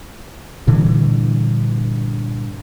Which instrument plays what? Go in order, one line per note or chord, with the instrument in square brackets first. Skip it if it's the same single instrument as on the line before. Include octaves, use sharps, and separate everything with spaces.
[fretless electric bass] G2 A#2 D3 E3